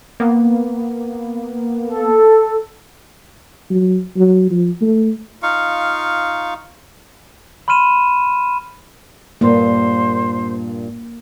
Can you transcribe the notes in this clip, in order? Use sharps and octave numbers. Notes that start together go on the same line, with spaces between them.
A#3 B3
A4
F#3
F#3
F3
A3
D#4 F4 F5 C#6
B5 C6 F6 D#7 E7
G2 A#2 A#3 B3 C5